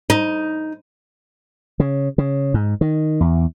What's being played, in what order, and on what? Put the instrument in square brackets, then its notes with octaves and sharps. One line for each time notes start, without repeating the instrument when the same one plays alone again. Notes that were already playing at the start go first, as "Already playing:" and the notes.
[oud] D#4
[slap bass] C#3
C#3
G#2
D#3
E2